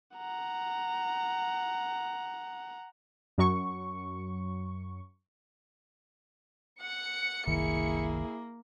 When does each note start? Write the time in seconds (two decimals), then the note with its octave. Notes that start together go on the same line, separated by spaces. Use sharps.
0.16 F#5 A#5
3.38 F#2 F#3 C#6
6.81 F#5 C#7
7.47 F#1 C2 D#3 A#3 E4 G#4